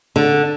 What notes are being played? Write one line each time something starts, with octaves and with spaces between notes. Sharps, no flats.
D3